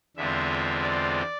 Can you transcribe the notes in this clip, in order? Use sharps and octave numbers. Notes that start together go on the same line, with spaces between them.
E2 D3 G#3 C4 F4 E5
D5